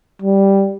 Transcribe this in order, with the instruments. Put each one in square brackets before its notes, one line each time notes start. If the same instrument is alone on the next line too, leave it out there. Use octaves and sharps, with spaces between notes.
[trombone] G3